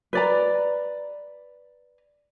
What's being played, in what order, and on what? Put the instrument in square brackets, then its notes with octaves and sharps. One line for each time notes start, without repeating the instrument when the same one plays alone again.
[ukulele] B4 D5 A#5